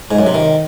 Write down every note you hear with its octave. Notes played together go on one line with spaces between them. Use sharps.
G#2
F#2
C3
D#3